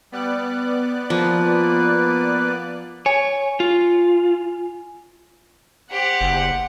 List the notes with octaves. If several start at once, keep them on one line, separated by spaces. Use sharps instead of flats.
G3 B3 D5 F#6
F3 A#3 B4
C#5 G#5
F4
G4 C5 F#5
F#1